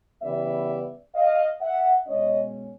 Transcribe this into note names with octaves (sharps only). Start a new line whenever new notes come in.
C#3 E3 G3 B3 D5 E5
D#5 F5
E5 F#5
B2 G#3 C#4 C#5 D#5